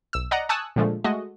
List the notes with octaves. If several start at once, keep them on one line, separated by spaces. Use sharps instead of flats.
B1 E6
D5 D#5 F#5 A#5
G#5 A5 C#6 D#6 E6 F#6
A#2 D3 F3 G#3 A3
G#3 A3 F#4 D#5